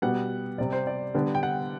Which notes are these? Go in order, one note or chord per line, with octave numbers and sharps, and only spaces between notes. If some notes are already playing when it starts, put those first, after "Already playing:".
B2 G3 B3 F#5
C3 G3 C4 D5
C5
D5
D3 G3 B3
G5
F#5